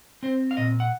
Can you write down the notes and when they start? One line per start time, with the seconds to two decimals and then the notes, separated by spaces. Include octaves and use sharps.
0.23 C4 C5
0.51 F5
0.57 A#2 D#5
0.80 F#5